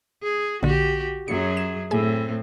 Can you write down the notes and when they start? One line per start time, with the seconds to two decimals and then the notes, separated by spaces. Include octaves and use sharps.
0.23 G#4
0.63 A#1 D3 F#4 G4
1.28 F#2 F#3 G#4 C#7
1.57 E7
1.91 A2 C4 G#4 G#5